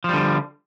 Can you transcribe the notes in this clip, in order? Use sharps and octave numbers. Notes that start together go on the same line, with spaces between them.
D3 F3 G3